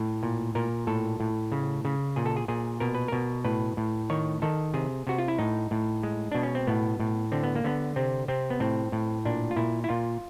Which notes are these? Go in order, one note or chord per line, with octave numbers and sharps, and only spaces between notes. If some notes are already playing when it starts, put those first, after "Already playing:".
Already playing: A2
A#2
A#2 A#4
A2 A4
A2
C#3
C#3
A#2 G#4
A4
G#4
A#2 G#4
B2 A#4
B4
B2 A#4
A2 B4
A2
D#3 C#5
D#3 A4
C3 G#4
C3 F#4
F4
E4
A2 D#4
A2
G#3
B2 D4
C#4
C4
A2 B3
A2
D3 C4
B3
A#3
D3 B3
C3 C4
C3 C4
B3
A2 C4
A2
A#2 D4
F4
A#2 E4
E4
A#2 F4